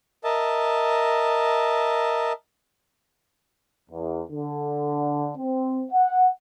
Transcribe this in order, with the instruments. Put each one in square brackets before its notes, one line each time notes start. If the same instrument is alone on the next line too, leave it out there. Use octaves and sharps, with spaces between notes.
[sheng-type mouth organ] A#4 D#5 E5 A5
[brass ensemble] E2
D3
C4
F#5